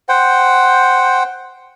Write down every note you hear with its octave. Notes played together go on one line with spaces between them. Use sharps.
C5 F#5 G5